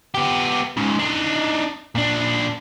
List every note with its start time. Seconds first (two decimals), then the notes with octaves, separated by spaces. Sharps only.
0.15 B3 G4
0.77 G#2 C#3
0.99 D4 D#4
1.95 A#2 D4